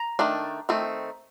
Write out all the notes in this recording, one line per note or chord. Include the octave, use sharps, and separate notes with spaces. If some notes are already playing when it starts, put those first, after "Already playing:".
Already playing: A#5
D#3 A3 D4
D#3 A3 C4